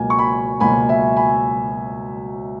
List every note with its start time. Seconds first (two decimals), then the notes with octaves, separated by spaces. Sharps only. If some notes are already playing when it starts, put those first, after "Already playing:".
Already playing: C#2 B2 F#3 A#3 G#5
0.10 C#6
0.19 G#5 B5
0.60 C#2 B2 F#3 A#3 G#5 B5
0.89 E5 G#5
1.17 G#5 B5